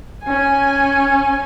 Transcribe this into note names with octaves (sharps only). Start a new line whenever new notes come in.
C#4 G#5